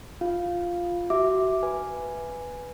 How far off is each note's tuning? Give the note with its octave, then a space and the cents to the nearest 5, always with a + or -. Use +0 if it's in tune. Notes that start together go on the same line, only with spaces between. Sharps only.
F4 +0 F5 +0
F#4 +30 E5 -5 D6 +0
B4 +0 G#5 +0